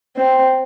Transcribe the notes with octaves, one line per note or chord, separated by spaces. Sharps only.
C4